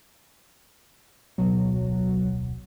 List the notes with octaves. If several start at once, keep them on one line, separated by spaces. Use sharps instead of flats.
D1 B1 B2 F#3